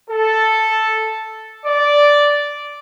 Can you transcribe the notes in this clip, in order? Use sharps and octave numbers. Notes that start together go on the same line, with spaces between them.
A4
D5